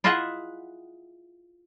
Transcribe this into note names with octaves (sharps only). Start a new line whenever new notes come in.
E4 F4 G#4 D#5 E5 F#5